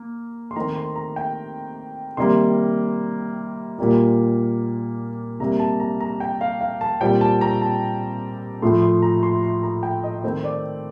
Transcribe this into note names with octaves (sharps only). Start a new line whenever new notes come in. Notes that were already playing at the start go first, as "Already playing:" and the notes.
Already playing: A#3
C6
D#3 A3 C4 A#5
C6
A#5
G5
C3 D#3 G3 A#3 C6
A#2 G3 A#3
C3 G3 A#3 A#5
A5
A#5
A#5
G5
F5
F5
A5
A#2 G3 C4 G5
A5
A#5
A5
A2 F3 A3 C6
C6
A#5
C6
C6
A#5
G5
D#5
D#3 A3 C4
D5